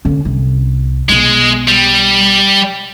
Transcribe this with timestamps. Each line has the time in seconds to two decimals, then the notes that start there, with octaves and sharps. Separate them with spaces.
0.05 D3 C#4
0.25 C2
1.09 B1 G#3 B3
1.68 G3